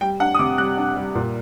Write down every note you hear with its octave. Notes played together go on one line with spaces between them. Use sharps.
G3 G5
D4 F#5
D#6
C3 D6
G3 F#6
D4
G3
A#2